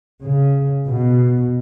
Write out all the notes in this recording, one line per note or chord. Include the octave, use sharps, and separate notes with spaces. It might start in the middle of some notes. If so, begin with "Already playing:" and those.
C#3
B2